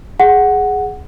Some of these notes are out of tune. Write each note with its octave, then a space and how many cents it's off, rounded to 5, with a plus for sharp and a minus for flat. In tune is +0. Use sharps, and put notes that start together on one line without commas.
G#4 +0 F#5 +0